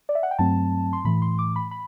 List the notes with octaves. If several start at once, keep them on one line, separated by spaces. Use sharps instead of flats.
D5
E5
F#5
G5
G2 F#3 A3 C4 A5
C6
A2 E3 A3 B5
C6
D6
B5
B5